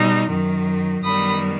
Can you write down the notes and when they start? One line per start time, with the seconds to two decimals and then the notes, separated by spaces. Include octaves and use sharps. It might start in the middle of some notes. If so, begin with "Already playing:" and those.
Already playing: B2 G3 D#4
0.29 F#2 D#3 F#3
1.03 F#2 D#3 G3 B3 B5 D#6